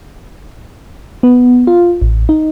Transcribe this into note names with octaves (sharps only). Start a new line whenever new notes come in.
B3
F4
A1
D#4